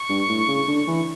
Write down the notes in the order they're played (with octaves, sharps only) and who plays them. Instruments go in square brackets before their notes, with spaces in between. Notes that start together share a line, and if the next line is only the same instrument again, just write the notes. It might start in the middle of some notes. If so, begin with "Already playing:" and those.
Already playing: [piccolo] C#6
[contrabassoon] G2
A2
C#3
D3
E3